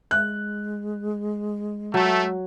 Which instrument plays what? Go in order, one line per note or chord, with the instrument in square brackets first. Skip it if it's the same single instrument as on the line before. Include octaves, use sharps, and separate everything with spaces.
[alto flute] G#3 [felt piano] F#6
[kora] F#3 [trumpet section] A3